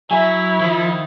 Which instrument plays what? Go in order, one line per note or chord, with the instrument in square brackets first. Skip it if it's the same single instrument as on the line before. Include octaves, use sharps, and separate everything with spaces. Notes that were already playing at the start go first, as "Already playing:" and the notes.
[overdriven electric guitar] F#3 [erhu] E4 [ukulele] E5 G#5
[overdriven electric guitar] D#3 [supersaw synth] F3